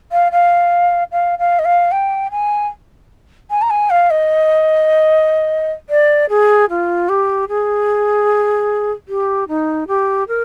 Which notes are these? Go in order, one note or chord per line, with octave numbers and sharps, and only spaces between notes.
F5
F5
F5
F5
D#5
F5
G5
G#5
G#5
A#5
G#5
F5
D#5
D5
G#4
F4
G4
G#4
G4
D#4
G4
A#4